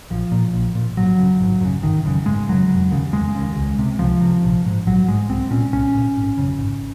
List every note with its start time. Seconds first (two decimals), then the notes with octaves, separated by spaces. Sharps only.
0.10 A#1 F3
0.32 A#2
0.54 A#1
0.75 A#2
0.97 G#1 F#3
1.18 F#2 C#3
1.40 G#1
1.61 F#2 C#3
1.83 G#1 D#3
2.05 F#2 C#3
2.26 G#1 G#3
2.49 F#2 C#3 F#3
2.69 F1
2.91 D#2 C#3
3.13 F1 G#3
3.35 D#2 C#3
3.56 C#2
3.79 C3
3.99 C#2 F3
4.21 C3
4.43 A#1
4.65 G#2
4.86 A#1 F#3
5.08 G#2 G#3
5.29 C2 C4
5.51 A#2 C#4
5.72 C2 C#4
5.95 A#2
6.17 G#1
6.38 F#2 C#3
6.59 G#1